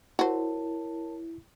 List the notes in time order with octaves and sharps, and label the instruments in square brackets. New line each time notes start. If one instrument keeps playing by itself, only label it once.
[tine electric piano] E4 [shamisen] F#4 C5 [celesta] A#4 C#5 A5